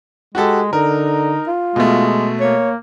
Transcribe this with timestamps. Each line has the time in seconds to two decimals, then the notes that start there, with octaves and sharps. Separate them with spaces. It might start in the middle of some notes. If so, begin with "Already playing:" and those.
0.35 G#3 F#4 G4 A4
0.73 D3 D#4 A#4
1.47 F4
1.76 B2 G#3 A3
2.40 A#3 C#5